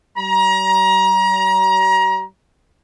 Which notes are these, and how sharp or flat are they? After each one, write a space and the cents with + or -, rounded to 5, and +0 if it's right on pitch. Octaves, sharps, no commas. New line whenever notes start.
G3 -45 A#5 +30